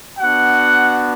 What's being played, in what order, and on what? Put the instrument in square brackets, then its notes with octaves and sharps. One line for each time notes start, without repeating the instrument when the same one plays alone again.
[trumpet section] B3 D4 F#4 F#5